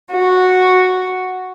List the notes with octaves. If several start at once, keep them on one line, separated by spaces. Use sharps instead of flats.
F#4